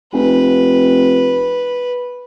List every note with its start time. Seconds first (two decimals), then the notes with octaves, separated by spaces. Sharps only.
0.13 F1 B4